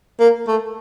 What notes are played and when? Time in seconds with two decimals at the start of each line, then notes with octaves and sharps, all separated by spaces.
0.20 A#3
0.48 A3